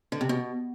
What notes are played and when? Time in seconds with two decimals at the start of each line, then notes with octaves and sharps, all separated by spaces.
0.12 D3
0.21 C3
0.29 B2